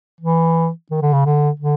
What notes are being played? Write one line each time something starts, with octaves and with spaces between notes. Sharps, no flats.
E3
D#3
D3
C#3
D3
D3